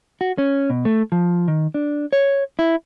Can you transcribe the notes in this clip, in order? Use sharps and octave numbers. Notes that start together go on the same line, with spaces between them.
F#4
C#4
B2
A3
F3
D#3
D4
C#5
E4